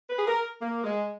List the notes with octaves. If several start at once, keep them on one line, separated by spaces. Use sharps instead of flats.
B4
G#4
A#4
A#3
G#3